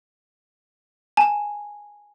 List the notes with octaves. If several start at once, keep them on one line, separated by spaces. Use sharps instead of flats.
G#5 A5